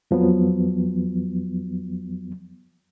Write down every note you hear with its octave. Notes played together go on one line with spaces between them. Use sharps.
F2 F3 F#3 B3